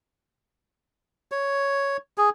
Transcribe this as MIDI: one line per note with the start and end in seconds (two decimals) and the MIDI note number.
1.32 1.97 73
2.18 2.30 68